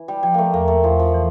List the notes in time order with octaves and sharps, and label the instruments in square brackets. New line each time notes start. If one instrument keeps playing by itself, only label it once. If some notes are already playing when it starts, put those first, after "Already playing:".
Already playing: [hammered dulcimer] E3
G3
[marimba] F3 [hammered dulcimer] G3
[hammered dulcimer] A3 A#3
[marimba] E2 [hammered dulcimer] A#3
[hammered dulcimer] A3
[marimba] E2 [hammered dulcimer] F3
[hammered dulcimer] F3
[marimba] E3